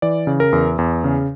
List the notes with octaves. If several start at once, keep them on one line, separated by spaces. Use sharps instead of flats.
E3 D5
C#3
A#4
E2
E2
C#3